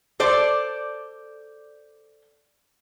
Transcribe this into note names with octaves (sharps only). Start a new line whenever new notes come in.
A4 C5 D5